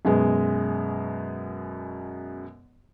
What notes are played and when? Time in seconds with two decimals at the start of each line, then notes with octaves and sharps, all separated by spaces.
0.05 F#2 B2 G#3